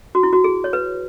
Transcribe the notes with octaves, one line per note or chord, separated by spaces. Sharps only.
F#4
E4
F#4
G#4
C#5
B4